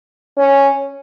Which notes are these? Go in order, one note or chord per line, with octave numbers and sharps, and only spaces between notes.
C#4